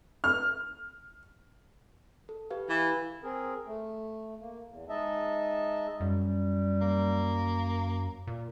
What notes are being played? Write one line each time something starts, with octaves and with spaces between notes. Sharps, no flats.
F6
A4
G4 B4 F5
E3
C4 G#4 A#4
A3
A#3
E2
G#3 D#4 D#5 E5 A5
F#2 G3
A#3
A#2